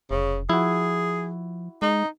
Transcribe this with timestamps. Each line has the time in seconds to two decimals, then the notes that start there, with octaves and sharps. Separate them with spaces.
0.11 F1 C#3
0.49 F3 E4 F#4 G#4
1.82 G#3 D#4